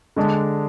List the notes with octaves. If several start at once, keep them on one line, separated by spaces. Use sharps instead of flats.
D3 G#3 D4